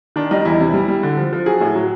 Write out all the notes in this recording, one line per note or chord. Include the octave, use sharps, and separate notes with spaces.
D#3 D4
G3 D#4
E2 E4
C3
G3
G3
D3
F3
F3
F#3 G#4
A2
F#3